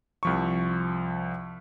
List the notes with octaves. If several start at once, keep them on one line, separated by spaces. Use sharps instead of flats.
C2 F3 C#6